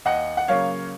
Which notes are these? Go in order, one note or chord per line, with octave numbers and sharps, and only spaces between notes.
D#2 D#5 F#5
F#5
C#3 F#3 A#3 C#5 F5